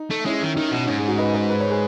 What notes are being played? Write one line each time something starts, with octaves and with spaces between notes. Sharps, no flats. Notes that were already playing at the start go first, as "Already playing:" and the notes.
Already playing: D#4
A3
G#3 C#4 E4
D#3
D#3 D#4
B2
G#2 C#4
G#4
D#4 F#4
B4 D#5
B4 D#5
B4
C#5
G#4 B4